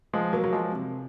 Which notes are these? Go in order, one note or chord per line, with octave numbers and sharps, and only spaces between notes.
F3 G#3
F#3 A#3
F#3
F3 G#3
C3